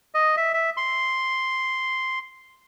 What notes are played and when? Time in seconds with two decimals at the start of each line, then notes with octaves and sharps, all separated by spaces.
0.15 D#5
0.37 E5
0.54 E5
0.77 C6